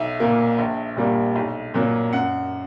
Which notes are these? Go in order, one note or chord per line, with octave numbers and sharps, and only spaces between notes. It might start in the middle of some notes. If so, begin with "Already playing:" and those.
Already playing: B1 E5
A#2 A#3
A#1
A#2 G3 A#3
B1
A#2 F#3 A#3
F#2 F#5